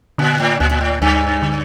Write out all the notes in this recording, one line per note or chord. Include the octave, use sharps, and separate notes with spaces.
A#2 D3
A2
D2 A#2
A#2
A2
D2 G2
D3